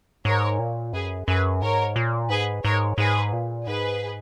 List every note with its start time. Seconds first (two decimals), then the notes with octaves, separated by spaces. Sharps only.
0.25 G#2 A#4 C#5
0.59 A#2
0.93 F#2 G#4 B4
1.27 F#2 G#4 B4
1.62 G#2 A#4 C#5
1.96 A#2
2.29 G#2 G#4 B4
2.64 G#2 A#4 C#5
2.98 G#2 G#4 B4
3.33 A#2
3.66 G#2 G#4 B4